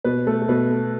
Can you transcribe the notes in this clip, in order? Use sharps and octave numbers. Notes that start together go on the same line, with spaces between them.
B2 B4
A3 A4
A4
B2 B4
A3